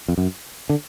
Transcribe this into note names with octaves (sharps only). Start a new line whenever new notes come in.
F2
F#2
D3